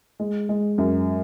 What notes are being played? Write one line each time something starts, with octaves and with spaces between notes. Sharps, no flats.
G#3
G#3
F#2